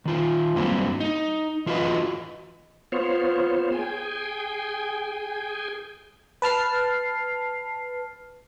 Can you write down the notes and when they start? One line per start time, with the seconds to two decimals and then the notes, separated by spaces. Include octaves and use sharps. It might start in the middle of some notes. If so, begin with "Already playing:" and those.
0.05 D#3 F4
0.56 G2 F#3 G3 A#3 C4
1.00 D#4
1.66 E3 F4 F#4 B4 D#5
2.92 B3 F4 C5 C#5
3.72 G#4 G5 G#5
6.42 B4 A5 F6 C7